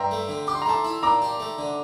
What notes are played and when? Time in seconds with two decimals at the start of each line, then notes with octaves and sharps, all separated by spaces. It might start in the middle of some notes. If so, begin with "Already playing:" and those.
Already playing: G2 E5 G5 A#5 C6
0.11 A3
0.29 D3
0.47 G4 D6
0.55 C6
0.62 A#5
0.66 A3 A5 C6
0.84 E4
1.03 A#2 A#5 D6
1.22 G4
1.40 A3
1.58 D3